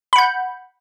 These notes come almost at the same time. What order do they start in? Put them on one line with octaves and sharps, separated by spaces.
B5 F#5 G6